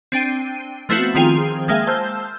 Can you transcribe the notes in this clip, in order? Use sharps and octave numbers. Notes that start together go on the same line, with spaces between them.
C4 D4 G5 D#7
F3 A3 B3 C4 E4 F#4
D#3 F3 C4 F4 G#4 G5
G#3 A#3 G#4 E5 F5 G5
C5 A5 E6 F6 G6